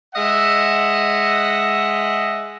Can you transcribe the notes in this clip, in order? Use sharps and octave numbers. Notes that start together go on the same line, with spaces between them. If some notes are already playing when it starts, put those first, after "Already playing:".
G#3 D#5 E5 F#5